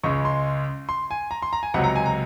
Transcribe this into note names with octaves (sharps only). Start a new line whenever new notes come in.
C#2 C#3 G#3 C#6
C6
C6
G#5
A#5
C6
A#5
G#5
C#2 C3 F#3 F#5
A#5
G#5
A#5